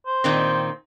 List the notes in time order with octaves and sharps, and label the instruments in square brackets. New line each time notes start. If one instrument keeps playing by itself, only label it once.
[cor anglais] C5
[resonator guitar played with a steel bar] A#2 D#3 C4